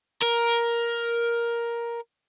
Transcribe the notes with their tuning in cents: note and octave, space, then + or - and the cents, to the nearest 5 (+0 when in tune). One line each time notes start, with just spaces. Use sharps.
A#4 +10